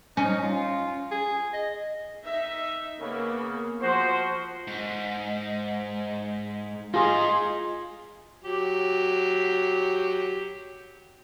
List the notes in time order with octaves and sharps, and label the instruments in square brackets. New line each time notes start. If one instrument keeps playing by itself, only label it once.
[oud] C#4 [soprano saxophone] D#4
[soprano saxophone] F4
G#4
D#5
[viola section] D#4 E5
[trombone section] C#3 [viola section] A#3 B3 C#4
[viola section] F3 [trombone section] F#4 C5
[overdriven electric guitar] G#2
[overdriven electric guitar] G#3 D#4 [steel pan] F4 G#4
[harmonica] F#3 G4